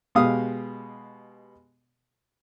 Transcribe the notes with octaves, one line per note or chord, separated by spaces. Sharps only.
B2 G#3 G4 F5 D#6